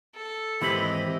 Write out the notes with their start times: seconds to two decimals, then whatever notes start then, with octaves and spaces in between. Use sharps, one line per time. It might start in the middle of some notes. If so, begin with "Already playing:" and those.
0.15 A4
0.62 D#2 G#2 E3 C4 E4 G4 D#5 B5